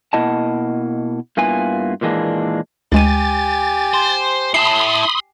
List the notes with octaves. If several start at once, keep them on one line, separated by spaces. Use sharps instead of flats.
B2 A#3 E4 D#5 F#5 A5
G2 A#3 B3 E4 F4 G#5
A#2 D#3 E3 G#3 A#3 D4
D2 G#3 G4 G#5 A6 D#7
C5
E4 A5 B5 C6 D#6 C7